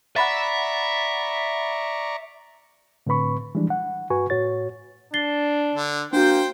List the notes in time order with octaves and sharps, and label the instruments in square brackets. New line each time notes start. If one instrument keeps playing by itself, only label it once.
[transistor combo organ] D5 A#5 C#6 [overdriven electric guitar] E5 [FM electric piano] F#5 B5 A6
[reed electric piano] A2 D3 C4 B4 B5 C#6
E3 F3 G3 G#3 D4
F#5
G2 F#4 B4 G#5 C#6
A2 F#4 C#5 A6
[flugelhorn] D4 [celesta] A6 C7 G7
[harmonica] D3
[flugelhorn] A#3 [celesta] D4 F#4 [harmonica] C5 G5